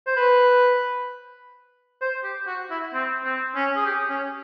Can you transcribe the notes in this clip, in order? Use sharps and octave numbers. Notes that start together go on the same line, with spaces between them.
C5
B4
C5
G4
F#4
E4
C4
C4
C#4
G#4
G4
C#4